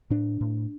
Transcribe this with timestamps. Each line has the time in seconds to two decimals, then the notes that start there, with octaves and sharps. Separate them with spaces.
0.10 A2 D4
0.41 A2